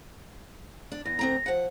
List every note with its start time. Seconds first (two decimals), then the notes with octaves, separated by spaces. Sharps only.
0.92 D4
1.05 E2 A#6
1.19 D2 C4 A#5
1.46 F3 F#5